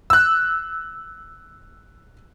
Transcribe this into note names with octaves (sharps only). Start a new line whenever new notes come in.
E6 F#6